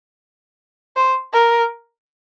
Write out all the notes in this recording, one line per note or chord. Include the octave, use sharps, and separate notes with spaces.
C5
A#4